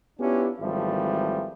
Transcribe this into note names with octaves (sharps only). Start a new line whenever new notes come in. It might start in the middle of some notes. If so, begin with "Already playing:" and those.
B3 C#4 D4 E4 F4 G4
G#1 E3 F3 G3 A3 E5